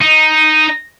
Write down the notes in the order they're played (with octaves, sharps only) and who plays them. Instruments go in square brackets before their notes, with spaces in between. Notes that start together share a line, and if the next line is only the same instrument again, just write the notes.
[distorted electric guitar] D#4